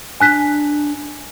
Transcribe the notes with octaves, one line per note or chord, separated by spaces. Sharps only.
D4 G#5 F#6 B6